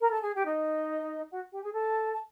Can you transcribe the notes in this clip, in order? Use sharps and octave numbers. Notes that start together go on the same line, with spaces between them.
A#4 A#5
A4 A5
G#4 G#5
G4 G5
D#4 D#5
F#4 F#5
G4 G5
G#4 G#5
A4 A5
A5